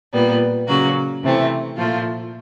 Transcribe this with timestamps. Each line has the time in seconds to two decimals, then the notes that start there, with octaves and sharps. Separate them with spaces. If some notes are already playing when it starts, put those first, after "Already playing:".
0.13 A#2 G3 B3
0.67 C#3 F#3 A#3 F#4
1.23 C3 E3 A3 C4
1.77 A#2 F3 A3 F4